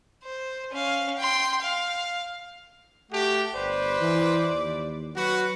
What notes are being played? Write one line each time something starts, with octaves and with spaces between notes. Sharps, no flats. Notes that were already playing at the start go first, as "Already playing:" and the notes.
C5
C#4 F5
G5 C6
F5
A3 F#4 G4
G1 B4 C5 D5
E3
D#2
F#3 F#4 B4